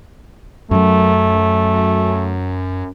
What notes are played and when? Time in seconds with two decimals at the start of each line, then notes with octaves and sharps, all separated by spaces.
0.71 F#2 F#3 A3